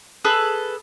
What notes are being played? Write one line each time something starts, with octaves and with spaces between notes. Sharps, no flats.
G#4 A4 B4